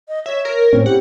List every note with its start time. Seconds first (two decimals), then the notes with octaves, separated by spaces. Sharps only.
0.08 D#5
0.26 C#5 E5
0.45 A#4
0.73 A2 C4 C#4
0.86 E4 G4 F#5